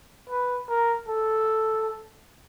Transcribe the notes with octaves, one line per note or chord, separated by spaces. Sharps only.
B4
A#4
A4